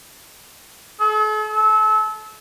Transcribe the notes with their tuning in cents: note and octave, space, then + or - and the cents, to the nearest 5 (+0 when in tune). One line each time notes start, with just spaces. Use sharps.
A4 -45
A4 -30